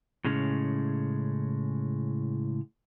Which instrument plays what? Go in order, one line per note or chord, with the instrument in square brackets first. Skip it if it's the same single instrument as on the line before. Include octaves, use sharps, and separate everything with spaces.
[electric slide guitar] A2 C#3 G#3 C#4